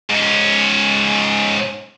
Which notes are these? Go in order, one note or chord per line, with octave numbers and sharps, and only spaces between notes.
G#2 C#4